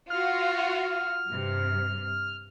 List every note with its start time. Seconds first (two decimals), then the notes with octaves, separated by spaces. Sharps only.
0.10 F4 F#4 F6
1.29 G2 C3